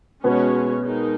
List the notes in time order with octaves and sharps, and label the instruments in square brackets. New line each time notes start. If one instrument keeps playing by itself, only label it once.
[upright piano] B2 B3 [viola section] G#3 C#4 F#4 C#5
[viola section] G#3 D#4 A#4